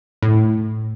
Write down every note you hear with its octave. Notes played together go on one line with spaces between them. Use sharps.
A2